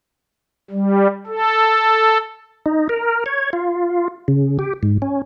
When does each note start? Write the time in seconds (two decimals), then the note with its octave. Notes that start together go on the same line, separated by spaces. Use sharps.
0.71 G3
1.27 A4
2.66 D#4
2.89 A#4
3.26 C#5
3.53 F4
4.28 C#3
4.59 G4
4.83 G#2
5.02 C#4